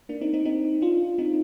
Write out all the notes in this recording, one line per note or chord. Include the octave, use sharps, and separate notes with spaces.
A#3 D4
C4 D#4
C4 D#4
C4 D#4
D4 F4
C4 D#4